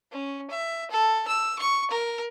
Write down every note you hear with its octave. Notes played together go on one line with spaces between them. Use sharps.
C#4
E5
A4
E6
C#6
A#4